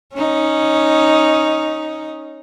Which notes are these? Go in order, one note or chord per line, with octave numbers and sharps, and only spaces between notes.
C#4 D#4